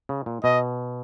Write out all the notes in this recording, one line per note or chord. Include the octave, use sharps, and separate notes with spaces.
C#3
A#2
B2 D#5